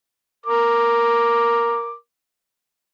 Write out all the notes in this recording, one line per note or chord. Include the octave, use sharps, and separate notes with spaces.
A#4 D6